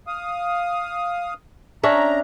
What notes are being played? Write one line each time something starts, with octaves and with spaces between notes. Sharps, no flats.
F5 D#6
C#4 D4 E5 A#5